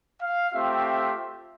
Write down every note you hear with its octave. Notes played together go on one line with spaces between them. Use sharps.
F5
A3 C4 F4 G4 E5